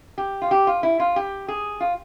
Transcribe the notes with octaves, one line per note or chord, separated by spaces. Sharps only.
G4
F4
G4
F4
E4
F4
G4
G#4
F4